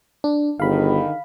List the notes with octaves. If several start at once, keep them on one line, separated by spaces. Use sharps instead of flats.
D4
G1 D3 D#3 G#4 F5 B5